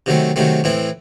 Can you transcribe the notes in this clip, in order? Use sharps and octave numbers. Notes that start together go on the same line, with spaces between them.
C3 D#3 F#3 A3 C4
C3 D#3 F#3 A3 C4
A2 E3 C4 E4